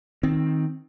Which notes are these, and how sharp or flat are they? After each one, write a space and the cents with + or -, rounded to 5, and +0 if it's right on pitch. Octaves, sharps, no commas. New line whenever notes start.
D#3 +10 C4 +15